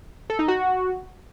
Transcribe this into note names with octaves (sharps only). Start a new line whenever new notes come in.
A4
D#4
F#4